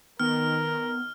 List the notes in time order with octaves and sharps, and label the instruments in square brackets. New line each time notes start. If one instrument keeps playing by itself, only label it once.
[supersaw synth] D#3 [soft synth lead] B3 [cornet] A#4 [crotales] F6